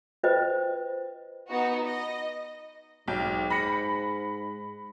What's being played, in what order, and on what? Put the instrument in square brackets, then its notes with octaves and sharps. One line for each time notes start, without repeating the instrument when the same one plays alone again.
[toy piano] F4 B4 C5 D#5 G5
[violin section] B3 D#4 F#4
D#5
[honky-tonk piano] B1 G5 [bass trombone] G#2
[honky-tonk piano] B5 A#6 C#7